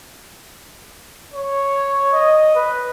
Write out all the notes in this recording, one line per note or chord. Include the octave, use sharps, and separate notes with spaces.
C#5
D#5
B4